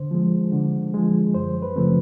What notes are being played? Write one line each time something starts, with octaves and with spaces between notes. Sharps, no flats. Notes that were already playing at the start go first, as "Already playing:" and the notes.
Already playing: D3 C5
F3 G#3
D3
F3 G#3
F#2 C5
B4
C#3 F3 A3 C4